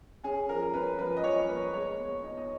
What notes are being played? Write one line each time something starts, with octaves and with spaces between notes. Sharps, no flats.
C#4 G#4
F3 A#4
C#4 B4
F3 B4
D#5
F3 C#5
A#3 B4
G#3 C#5
B3
D#4
D#5